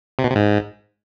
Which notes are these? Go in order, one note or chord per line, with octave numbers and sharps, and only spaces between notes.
C3
B2
C3
G#2